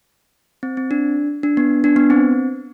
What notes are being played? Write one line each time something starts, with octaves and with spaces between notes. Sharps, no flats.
C4
C4
D4
D4
B3
D4
B3
C4